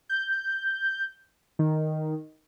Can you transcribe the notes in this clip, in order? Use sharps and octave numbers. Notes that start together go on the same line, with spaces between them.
G6
D#3